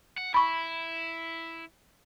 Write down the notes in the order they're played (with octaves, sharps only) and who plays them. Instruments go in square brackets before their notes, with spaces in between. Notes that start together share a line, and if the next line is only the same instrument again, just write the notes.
[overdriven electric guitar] F#5
[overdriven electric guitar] E4 [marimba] B5 C#6